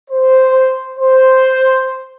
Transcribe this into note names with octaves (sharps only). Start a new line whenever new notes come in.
C5
C5